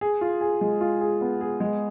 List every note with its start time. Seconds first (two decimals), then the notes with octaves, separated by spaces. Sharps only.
0.01 G#4
0.21 F4
0.41 G#4
0.61 G#3
0.81 F4
1.01 G#4
1.21 B3
1.41 G#4
1.60 G#3